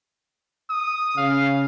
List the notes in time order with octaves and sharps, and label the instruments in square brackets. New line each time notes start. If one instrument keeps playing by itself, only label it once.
[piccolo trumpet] D#6
[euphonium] C#3 [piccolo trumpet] F5